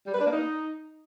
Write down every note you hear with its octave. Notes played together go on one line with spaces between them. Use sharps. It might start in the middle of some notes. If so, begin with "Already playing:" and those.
G3
B4
D4
A#3
D#4